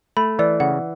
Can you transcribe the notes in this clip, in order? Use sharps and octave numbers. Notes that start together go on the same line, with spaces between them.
A3 B5
E3 D5
C#3 F#5